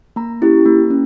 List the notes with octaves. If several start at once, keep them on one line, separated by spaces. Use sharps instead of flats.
A#3 A#5
C#4 E4 G4
A#3
C#4